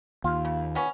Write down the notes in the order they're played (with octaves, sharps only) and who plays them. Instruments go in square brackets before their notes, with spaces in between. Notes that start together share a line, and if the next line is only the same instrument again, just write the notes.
[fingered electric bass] D#2 [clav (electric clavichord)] F4
[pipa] C#3
B3 C#4